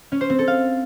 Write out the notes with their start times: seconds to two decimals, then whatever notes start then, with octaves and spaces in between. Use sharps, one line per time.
0.12 C#4
0.21 C5
0.30 C4
0.39 A4
0.48 F5